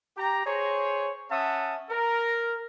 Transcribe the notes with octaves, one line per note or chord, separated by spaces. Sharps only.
G4 A#5
G#4 C5 C#5
C#4 E5 F#5 A5 D#6
A#4